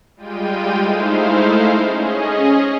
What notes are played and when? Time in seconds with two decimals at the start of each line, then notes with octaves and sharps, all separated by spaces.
0.16 G3 G#3 F4 G5 D#7
0.82 G#3 A3 D#4 E4 C5 F5
1.83 C#4 G#4 D#5